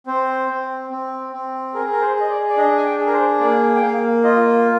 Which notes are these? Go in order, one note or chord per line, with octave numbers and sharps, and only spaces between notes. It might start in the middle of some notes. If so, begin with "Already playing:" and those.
C4 C5
C4
C4
C4
G#4 A#4
A#4
C5
G#4 D#5
D5
D5
D4 D#5
G#5
G5
G#4
A#4
C5
A#3 D5
G5
A#3 F5
F4 D#5